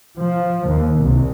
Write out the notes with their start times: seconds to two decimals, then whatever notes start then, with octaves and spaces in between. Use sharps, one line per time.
0.18 F3
0.67 D#2
0.99 C2